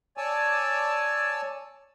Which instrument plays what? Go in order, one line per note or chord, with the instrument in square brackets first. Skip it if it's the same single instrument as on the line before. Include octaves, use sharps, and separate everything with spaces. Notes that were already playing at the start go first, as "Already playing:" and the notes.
[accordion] C#5 D5 G#5 A5 E6